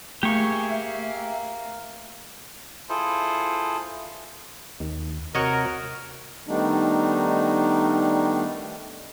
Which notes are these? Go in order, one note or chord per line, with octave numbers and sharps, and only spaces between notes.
A3 A#3 G4 G#4 E5 C#6
E4 F4 G#4 A4 C5
D#2
C3 F#4 A#4 C#5 D#5
D#3 G3 A3 B3 D4 D#4